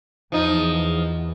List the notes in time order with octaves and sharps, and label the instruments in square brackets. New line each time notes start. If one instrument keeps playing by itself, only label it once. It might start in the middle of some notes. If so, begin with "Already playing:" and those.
[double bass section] E2 [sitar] F3 D#4